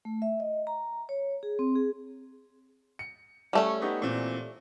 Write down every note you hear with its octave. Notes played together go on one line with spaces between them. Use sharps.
A3
E5
D#5
A#5
C#5
G#4
C4
G#4
C#7
G3 A3 C#4
B3 D#4 G4
A#2 E3 C4